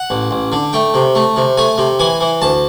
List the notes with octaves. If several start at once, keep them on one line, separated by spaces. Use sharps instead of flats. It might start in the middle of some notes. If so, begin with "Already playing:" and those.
Already playing: F#5
A1
A1
D3
A3 G5
C3
A3
C3
A3 G#5
C3
E3 G#5
E3
D2 A5